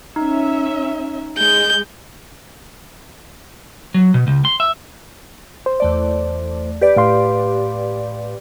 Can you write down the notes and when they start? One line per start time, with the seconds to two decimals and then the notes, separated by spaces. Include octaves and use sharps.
0.16 C#4 D#4 E5
1.38 G#3 G6
3.94 F#3
4.14 B2
4.27 C#2
4.45 C6
4.60 E5
5.66 C5
5.80 E2 A3 D5
6.81 G4 B4 D5
6.96 A2 F5 C6